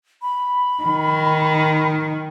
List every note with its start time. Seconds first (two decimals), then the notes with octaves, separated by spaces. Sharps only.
0.22 B5
0.84 D#3